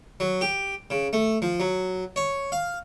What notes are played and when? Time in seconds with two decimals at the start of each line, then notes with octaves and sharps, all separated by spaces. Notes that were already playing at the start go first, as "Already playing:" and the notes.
0.20 F#3
0.41 G4
0.90 C#3
1.13 A3
1.42 F3
1.60 F#3
2.16 C#5
2.52 F5